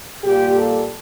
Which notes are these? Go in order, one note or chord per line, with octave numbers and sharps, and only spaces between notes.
A#2 G3 A#3 G4
A4